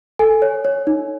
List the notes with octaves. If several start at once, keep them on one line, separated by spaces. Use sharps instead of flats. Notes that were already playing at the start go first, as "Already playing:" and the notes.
A4 G#5
C#5
C#5
D#4